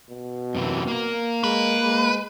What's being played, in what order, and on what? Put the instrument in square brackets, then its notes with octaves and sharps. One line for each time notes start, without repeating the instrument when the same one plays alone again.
[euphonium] B2
[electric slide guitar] F#2 C3 E3
A#3 A#4
[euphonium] G#3 [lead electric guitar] B4
[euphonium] G#3